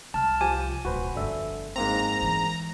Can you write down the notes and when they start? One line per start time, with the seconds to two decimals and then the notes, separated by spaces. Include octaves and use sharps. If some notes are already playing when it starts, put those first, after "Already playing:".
0.14 C2 A5 F6
0.41 F3 G4 G#5
0.85 D1 B1 F#4 B4 C5
1.16 G1 F2 D3 E5
1.76 G#2 A#3 C4 A#5
2.22 E3 G#3